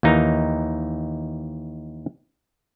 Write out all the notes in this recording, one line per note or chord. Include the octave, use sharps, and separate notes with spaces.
D#2 E3 D#4 A#4 A#5